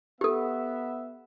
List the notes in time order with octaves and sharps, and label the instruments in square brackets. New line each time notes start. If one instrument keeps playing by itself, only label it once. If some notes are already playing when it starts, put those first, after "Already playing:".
[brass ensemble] B3 E5 [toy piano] G4 A4